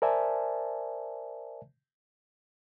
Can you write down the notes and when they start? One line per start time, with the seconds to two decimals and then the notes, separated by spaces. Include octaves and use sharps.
0.02 A#4 C5 D5 E5 G#5 A5